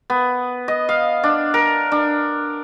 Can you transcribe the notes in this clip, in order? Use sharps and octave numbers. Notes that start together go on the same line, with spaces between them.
B3
D#5
F5
D4
A#4
D4